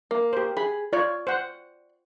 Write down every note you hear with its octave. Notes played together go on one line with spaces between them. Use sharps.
A#3
G4 C5
G#4 B5
F4 C#5 D5
C5 F#5